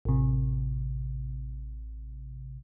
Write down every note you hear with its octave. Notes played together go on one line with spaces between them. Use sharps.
A1 C3